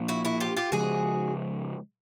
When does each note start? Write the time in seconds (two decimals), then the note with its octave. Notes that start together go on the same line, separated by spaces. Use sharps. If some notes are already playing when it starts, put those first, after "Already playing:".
Already playing: A#2 F3 A#3 D4
0.08 E4 F#4
0.25 E4 F#4
0.40 F4 G4
0.57 F4 G4
0.72 C#3 F3 G#3 F#4 G#4